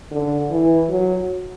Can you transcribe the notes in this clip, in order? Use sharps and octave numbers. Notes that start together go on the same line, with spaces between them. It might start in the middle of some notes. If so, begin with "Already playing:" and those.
D3
E3
F#3